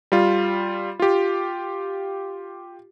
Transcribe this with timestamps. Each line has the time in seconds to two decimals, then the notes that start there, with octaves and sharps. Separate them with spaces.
0.12 G3 F4
0.99 F4 G4